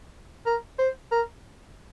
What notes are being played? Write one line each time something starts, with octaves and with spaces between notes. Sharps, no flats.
A#4
C5
A#4